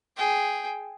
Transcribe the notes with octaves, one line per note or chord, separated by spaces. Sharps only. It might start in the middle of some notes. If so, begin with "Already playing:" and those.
G#4 G5